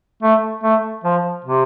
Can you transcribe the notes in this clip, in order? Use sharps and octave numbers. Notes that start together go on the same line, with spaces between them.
A3
A3
F3
C3